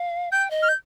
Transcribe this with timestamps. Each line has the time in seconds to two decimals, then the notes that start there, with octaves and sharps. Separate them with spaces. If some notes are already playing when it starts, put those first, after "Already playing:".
Already playing: F5
0.32 G5 G6
0.50 D#5
0.62 F6
0.69 G6